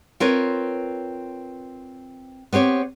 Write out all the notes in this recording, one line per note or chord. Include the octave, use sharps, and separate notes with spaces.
C4 F4 A#4 B4 C#5
B3 C4 G4 C#5